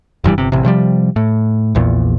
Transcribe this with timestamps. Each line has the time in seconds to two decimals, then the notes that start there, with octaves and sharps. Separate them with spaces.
0.24 F1 G2 E3 G3
0.38 G1 C3
0.52 A1 C3
0.64 C3 F3 G3
1.16 A2
1.75 A#1 E2 A#2